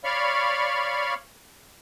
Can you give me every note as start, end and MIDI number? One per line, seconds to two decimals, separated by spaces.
0.04 1.14 73
0.04 1.14 74
0.04 1.14 77
0.04 1.14 83
0.04 1.14 85
0.04 1.14 89